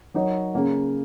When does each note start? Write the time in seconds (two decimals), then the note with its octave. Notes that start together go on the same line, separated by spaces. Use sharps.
0.14 F#3 D#4 A#4 C#5
0.54 C#3 A#3 C#4